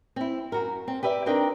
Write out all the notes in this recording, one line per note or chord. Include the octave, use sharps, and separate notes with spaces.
C4 E4
F#2 F#4 A#4
C4
G4 B4 D5 E5
C4 D4 D#4 A#4 G5